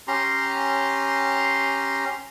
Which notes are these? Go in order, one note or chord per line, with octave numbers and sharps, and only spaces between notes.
C#4 G4 A#5 C6